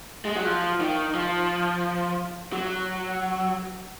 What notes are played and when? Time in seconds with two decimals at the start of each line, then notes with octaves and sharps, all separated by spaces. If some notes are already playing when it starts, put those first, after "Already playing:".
0.25 G#3
0.36 F#3
0.46 F3
0.80 D#3
1.15 F3
2.53 F#3